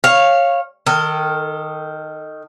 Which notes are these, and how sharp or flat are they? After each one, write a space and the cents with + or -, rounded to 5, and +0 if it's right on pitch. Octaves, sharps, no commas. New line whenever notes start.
C#5 -15 F5 +0
D#3 +0 A4 +35